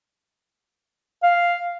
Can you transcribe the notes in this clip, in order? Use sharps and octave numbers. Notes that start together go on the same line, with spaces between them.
F5